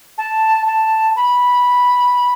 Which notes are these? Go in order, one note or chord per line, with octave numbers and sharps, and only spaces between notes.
A5
A5
B5